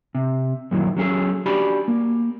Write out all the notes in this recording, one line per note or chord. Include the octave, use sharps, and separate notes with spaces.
C3
F#2 A#2 D#3 E3 F#3
F#3 C#4 G#4 A4
D4 F#4 G4 D5 G#5 B5
A#3